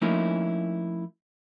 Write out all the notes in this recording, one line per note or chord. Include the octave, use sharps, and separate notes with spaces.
F3 A3 A#3 C#4 D#4 E4